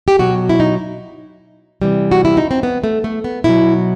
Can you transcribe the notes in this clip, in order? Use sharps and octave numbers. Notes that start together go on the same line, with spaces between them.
G4
B2 F#3 F#4
E4
D#4
C3 E3 G3
F#4
E4
D#4
C4
B3
A3
A3
B3
B2 F#3 E4